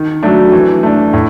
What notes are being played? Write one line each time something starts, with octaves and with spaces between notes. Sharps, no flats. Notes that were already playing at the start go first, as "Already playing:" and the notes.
Already playing: D#3
F#3 A3 D4
E3
A3 D4
A2